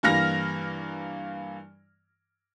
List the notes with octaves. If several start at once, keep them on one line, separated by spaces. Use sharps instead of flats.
G2 E3 A#3 F6 A#6